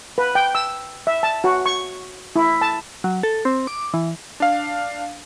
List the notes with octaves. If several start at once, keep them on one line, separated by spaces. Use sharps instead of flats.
B4
G5
E6
E5
A5
F#4
C#6
E4
A5
F#3
A4
C4
D6
E3
D4 F5